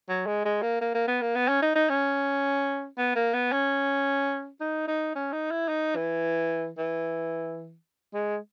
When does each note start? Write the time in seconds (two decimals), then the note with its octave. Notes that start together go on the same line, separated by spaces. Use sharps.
0.09 F#3
0.26 G#3
0.45 G#3
0.62 A#3
0.81 A#3
0.94 A#3
1.08 B3
1.22 A#3
1.36 B3
1.48 C#4
1.62 D#4
1.75 D#4
1.89 C#4
2.98 B3
3.15 A#3
3.34 B3
3.52 C#4
4.60 D#4
4.87 D#4
5.15 C#4
5.33 D#4
5.51 E4
5.68 D#4
5.96 E3
6.78 E3
8.13 G#3